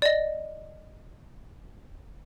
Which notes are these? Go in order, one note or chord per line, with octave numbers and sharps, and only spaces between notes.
D5 D#5